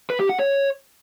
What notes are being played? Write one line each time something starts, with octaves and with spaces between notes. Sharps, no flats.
B4
G4
F#5
C#5